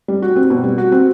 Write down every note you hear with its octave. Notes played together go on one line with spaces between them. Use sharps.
G3
F#4
C4
B2
G3
F#4
C4